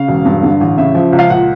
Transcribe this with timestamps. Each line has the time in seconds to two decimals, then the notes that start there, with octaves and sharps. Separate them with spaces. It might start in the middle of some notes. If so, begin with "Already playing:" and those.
Already playing: C#3 F5
0.08 E1
0.25 G2
0.43 D3
0.61 A1
0.77 C#3 E5
0.95 F3
1.13 C#2
1.19 F5
1.30 A#2 F#5